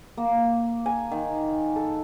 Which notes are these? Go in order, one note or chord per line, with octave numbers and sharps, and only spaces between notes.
A#3
G#5
D#3
A4